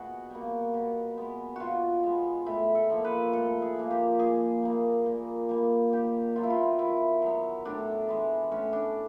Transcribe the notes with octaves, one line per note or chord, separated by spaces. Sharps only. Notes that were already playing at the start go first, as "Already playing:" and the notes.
Already playing: B2 F#4 G#4
G3 A#3
B2
G#3 B3
B2 F4 F#4
G#3 B3
A2 E4
A4
F3 A#3
B4
A2 A4
G#4
F3 A#3
G4
A#2 G#4
G3 A#3
A#2
G3 A#3
D#3 G4
F#3 B3 F4
E4
F4
D#3 E4
F#3 B3
A2 D4
E3 G#3
A2 C#4
D4